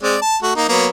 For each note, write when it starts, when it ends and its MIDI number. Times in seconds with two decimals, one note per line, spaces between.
0.03 0.16 56
0.03 0.16 60
0.03 0.16 74
0.22 0.38 81
0.43 0.54 57
0.43 0.54 66
0.56 0.67 58
0.56 0.67 63
0.68 0.88 54
0.68 0.88 58
0.68 0.88 59